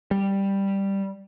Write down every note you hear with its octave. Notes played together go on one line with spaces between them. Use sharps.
G3